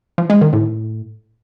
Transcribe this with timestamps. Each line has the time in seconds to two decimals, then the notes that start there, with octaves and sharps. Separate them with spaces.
0.18 F3
0.30 G#3
0.41 D#3
0.53 A2